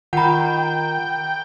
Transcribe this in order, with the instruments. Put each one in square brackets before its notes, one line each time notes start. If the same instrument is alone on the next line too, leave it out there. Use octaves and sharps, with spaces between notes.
[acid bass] D#3 [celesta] F4 B5 [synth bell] F#5 A#5 [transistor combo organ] G5